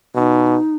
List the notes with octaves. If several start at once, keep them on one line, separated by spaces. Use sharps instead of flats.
B2 D#4